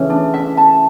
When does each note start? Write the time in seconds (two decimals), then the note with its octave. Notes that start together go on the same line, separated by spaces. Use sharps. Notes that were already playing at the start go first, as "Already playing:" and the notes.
Already playing: C#3 E3 A3 C#4
0.10 D4
0.34 E5
0.57 A5